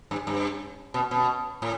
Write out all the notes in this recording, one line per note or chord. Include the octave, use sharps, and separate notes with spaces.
G2
G2
B2
B2
A2